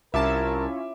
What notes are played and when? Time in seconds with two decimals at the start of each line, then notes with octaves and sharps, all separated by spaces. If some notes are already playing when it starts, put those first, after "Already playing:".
0.14 C2 C#4 E4 F4 A#4 E5 A5 D6